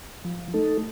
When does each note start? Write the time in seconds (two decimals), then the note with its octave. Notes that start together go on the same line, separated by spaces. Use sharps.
0.25 F3
0.54 A3 D#4 A4